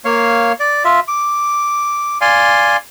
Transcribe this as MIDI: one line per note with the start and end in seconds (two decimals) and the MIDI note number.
0.05 0.53 58
0.05 0.53 73
0.05 0.53 77
0.60 0.83 74
0.85 1.00 65
0.85 1.00 76
1.08 2.18 86
2.21 2.77 74
2.21 2.77 77
2.21 2.77 80
2.21 2.77 84